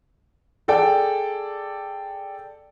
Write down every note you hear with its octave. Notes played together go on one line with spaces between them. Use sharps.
G#4 A4 D5 G5